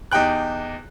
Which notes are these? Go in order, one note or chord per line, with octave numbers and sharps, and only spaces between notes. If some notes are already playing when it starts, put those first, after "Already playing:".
E2 D#4 G4 G5 F#6